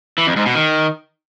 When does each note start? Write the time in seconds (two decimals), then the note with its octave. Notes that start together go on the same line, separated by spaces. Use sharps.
0.18 E3
0.27 F2
0.36 G#2
0.46 B2
0.55 D#3